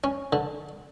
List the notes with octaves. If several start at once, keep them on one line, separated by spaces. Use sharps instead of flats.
C#4
D3